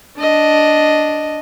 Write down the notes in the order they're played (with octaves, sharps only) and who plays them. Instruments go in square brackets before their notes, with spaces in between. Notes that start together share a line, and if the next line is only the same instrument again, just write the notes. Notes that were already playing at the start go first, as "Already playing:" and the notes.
[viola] D4 D#5